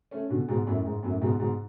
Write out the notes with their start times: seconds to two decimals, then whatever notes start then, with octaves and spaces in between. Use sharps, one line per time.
0.11 A3 C#4
0.30 B2 D3
0.48 G#2 B2
0.67 F#2 A2
0.85 G#2
1.03 F#2 A2
1.21 G#2 B2
1.40 G#2 B2